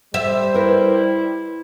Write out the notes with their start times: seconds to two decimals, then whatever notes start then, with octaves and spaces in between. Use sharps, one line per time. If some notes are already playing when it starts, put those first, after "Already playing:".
0.14 G3 C5 E5
0.54 E4 A#4 B4